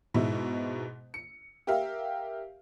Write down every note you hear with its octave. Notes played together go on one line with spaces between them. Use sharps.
G#2 B2 E4
C#7
G4 A#4 E5 F5